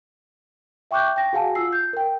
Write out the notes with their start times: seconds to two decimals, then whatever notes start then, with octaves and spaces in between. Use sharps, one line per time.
0.91 E5 G5 C#6 D6 F#6 G6
1.16 G5 A#6
1.33 F#4 G#4 F5 F#5 G#5 A5
1.55 F4 E6 C7
1.73 G6
1.93 A#4 G5